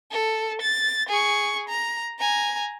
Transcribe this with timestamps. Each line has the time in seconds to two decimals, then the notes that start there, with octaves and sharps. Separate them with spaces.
0.11 A4
0.61 A6
1.09 G#4 C#6
1.69 A#5
2.19 G#5 A#5